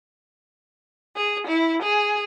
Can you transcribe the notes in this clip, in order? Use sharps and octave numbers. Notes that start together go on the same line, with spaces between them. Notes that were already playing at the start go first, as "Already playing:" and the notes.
G#4
E4
G#4